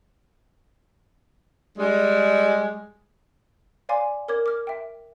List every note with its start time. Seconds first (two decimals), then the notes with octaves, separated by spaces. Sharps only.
1.78 G3 G#3
3.89 C#5 D5 F5 G#5 C6 D6
4.28 A#4 C#5 D6 G#6
4.46 D6 F6
4.67 E5 G5